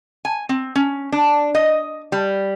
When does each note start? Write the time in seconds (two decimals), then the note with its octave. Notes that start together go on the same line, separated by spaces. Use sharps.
0.25 G#5
0.49 C4
0.75 C#4
1.12 D4
1.55 D#5
2.12 G3